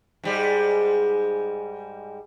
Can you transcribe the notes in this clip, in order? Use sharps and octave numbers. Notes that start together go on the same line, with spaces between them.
G#2 G3 G#3